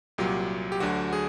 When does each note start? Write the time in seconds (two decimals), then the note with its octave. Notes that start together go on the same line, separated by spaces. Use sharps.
0.18 C2 A#2 F#3 G4
0.72 G4
0.80 D2 D3 F#3 F#4
1.13 G#4